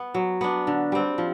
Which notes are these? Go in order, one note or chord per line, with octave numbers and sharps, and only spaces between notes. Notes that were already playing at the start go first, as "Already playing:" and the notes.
Already playing: B3
F#3
B3 D4
D3
G3 C4
F3